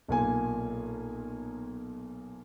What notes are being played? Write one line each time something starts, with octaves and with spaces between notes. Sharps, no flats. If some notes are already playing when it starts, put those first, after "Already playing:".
B1 A#2 G#5